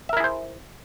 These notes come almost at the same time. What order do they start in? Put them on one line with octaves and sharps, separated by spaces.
E5 A#4 E4 G#4 C5